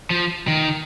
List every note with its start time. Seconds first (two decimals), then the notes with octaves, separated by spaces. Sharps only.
0.10 F3
0.48 D#3